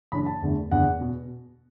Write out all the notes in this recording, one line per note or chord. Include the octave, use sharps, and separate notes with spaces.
F#1 F#2 E3 D4 B5
A5
E2 D3 A3
F#1 E2 D3 F#5
B2